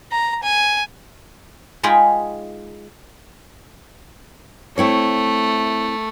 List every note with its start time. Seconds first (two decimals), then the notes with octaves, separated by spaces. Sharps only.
0.12 A#5
0.43 G#5
1.83 G#3 D#4 F4 G#4 G5 B5
4.78 A3 C4 E4 C#5